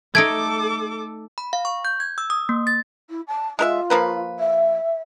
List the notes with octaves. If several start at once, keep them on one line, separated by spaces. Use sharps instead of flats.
A3 D#4 A4 D6 G#6 D7
B5
F5
C#6
G6
G#6
E6
D#6
A#3
A6
E4
A5
G#3 F4 A#4 E5
F3 A#3 B4
E5